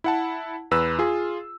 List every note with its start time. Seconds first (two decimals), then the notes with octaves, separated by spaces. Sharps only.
0.04 E4 F#5 A5
0.71 E2 B4 E6
0.99 F4 G#4